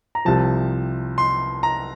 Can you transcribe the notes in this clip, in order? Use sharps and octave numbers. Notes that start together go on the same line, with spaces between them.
A#5
C2 C3 F3 A5
C6
A#5